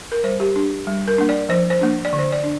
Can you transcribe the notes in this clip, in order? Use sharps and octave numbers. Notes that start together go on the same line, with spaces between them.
A#4
G3 C5
G4
D4
G3
A#4
A#3 D4
D5
F3 C5
C5
A#3 D4
D5
D3
C5
D5
D4